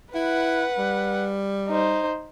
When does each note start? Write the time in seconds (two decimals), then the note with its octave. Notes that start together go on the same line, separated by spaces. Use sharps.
0.15 E4 B4 F#5
0.78 G3
1.68 D#4 C5